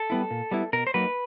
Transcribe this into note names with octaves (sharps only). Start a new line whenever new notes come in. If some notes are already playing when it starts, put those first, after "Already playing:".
Already playing: A4
G3 B3 E4
A#2
G3 B3 E4
B2 A#4
C5
F#3 A#3 D#4 B4